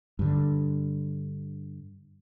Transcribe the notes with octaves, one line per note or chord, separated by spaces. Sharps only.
G2 D3